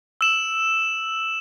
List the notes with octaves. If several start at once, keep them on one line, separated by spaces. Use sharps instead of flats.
E6 E7 F#7